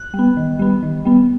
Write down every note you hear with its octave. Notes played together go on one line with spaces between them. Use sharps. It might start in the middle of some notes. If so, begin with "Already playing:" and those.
Already playing: F#6
G3
B3
D#3
G3 B3
D#3
G3 B3